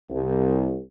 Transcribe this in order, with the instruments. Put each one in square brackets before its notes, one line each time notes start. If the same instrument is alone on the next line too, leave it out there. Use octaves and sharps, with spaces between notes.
[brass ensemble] C2